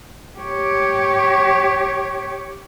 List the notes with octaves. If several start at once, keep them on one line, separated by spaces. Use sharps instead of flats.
G4 C#5